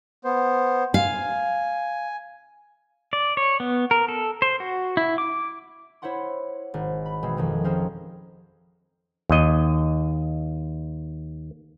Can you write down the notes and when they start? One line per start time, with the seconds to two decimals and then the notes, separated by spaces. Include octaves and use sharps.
0.24 B3 C5
0.94 F5 G#5
3.13 D5
3.37 C#5
3.60 B3
3.91 A#4
4.08 A4
4.42 C5
4.60 F#4
4.97 E4
5.18 D6
6.02 E4 C5 C#5 F#5 C6
6.74 G#1
7.06 B5
7.23 B2 E3 G#3 C4
7.37 F2 D#3 F3
7.64 C4 C#4 G#4 A#4 C5
9.30 D#2 D#5